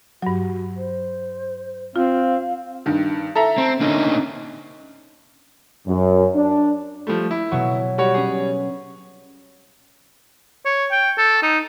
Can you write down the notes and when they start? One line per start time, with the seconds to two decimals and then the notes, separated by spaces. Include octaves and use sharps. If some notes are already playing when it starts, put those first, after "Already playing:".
0.22 G2 F#3 F#4
0.77 C5
1.96 C4 F4 F5
2.86 G2 D#3
3.35 A4 E5 A#5
3.58 C4
3.81 D3 A#3 C#4 D#4
5.87 F#2
6.35 D4
7.07 F3 G3 A3
7.31 E4
7.52 B2 F#3
7.98 G3 F#4 C#5
8.14 C#4 G#4
10.65 C#5
10.91 G5
11.18 A4
11.43 D#4